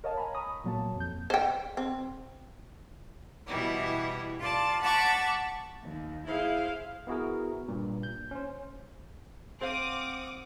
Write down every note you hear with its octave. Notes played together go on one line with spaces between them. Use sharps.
A#4 C#5 D#5 F5 A5
G#5 A#5 B5
A#5 B5 C#6 D#6
A#2 F#3 A#3 A5
F2 G6
C5 G5
C4
B2 E3 G3 E4
F4 D5 A5
F#5 A5 B5 C#6 D6
D#2
E4 G#4 C5 F5
B3 E4 F#4 G#4 A#4
G2 A#2
G6
C#4 C5
C4 C5 F5 F#5 D6 D#6